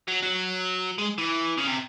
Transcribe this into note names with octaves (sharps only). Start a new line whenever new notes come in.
F#3
F#3
G#3
E3
C#3
C3